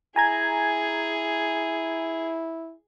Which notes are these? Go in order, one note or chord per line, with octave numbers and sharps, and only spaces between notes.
E4 G#4 G#5 A#5 G#6